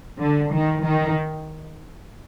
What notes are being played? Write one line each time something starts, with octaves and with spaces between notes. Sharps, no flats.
D3
D#3
D#3